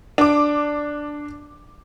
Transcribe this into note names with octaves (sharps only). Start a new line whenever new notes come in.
D4 D6